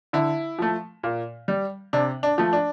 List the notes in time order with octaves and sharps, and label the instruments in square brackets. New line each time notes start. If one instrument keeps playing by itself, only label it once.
[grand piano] D3 E4
F3 A3
A#2
G3
C3 D4
D4
F3 A3
D4